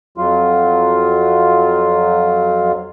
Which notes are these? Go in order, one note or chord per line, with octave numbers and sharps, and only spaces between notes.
F2 F#3 F4